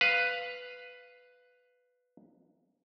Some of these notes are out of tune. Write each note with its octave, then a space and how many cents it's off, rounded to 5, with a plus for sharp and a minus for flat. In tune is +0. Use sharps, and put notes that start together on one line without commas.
B4 +5 F5 +0